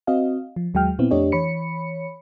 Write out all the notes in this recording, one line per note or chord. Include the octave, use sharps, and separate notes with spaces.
C4 F#4 D#5 F5
F3
D#2 F#3 G#3 G5 F6
A#2 B3 C4 E4
F2 A3 D4 G4 C#5 D#5
E3 C#5 B5 C#7